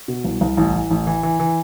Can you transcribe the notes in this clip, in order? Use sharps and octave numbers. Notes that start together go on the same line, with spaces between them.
B2
C2
C2
A1
E3
A1
E3
E3
E3